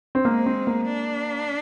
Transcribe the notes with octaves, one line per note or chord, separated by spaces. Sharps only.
C4
G#3 A#3
C4
A#3
D4